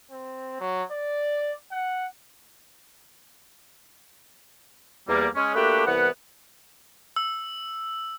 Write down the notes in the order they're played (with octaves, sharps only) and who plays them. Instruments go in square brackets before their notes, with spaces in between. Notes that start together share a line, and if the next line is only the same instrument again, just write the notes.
[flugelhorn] C4
F#3
D5
F#5
[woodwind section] E2 G3 A#3
G#3 C#4
A3 A#3 D4 F#4 G4 B4
C2 E3 B3 B4 F#5
[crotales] E6